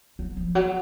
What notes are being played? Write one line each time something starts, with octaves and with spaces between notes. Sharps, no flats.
F#3
F3
F#3